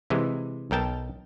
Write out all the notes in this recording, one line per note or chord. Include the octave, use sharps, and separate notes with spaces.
C3 E3 G#3
B1 A#4 G5 A5